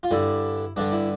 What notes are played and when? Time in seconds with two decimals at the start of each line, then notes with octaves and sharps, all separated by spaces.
0.03 F4
0.11 G2 D3 E4
0.76 G2 D3 D4
0.92 E4